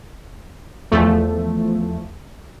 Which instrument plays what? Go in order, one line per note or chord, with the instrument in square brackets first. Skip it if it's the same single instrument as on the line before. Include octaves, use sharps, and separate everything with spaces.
[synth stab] E2 F3 A3